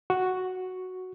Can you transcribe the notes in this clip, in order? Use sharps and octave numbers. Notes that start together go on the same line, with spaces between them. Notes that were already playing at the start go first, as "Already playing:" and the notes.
F#4